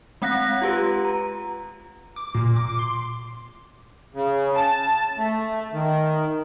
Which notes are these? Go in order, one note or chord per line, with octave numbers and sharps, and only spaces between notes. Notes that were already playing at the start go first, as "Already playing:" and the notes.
G#3 C4 F#5 F#6 A#6
F4 G4 B4
A#5
D6
A#2
D6
C6
C#3
A5
A3
D#3